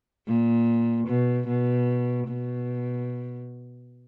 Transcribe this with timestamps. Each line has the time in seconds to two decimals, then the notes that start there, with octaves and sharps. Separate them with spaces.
0.27 A#2
1.07 B2
1.48 B2
2.28 B2